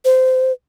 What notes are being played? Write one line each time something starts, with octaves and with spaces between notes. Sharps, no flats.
C5